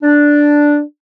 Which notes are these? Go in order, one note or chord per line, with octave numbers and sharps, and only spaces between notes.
D4